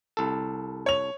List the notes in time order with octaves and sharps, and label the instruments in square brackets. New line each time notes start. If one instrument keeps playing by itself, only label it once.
[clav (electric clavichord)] C2 A4
[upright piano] C#5 F7